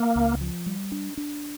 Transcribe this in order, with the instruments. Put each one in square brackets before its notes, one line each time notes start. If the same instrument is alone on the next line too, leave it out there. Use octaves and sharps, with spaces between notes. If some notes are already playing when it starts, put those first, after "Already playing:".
Already playing: [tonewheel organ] A#3
[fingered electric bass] C#2
F3
G3
D4
D4